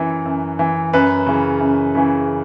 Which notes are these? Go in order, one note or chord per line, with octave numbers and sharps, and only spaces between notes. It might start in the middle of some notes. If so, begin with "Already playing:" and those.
Already playing: F#2 E3
F#2
E3
F#2 B4
C#3 E3
F#2
C#3 E3